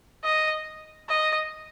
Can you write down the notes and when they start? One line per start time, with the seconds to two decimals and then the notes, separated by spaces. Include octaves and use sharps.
0.24 D#5
1.08 D#5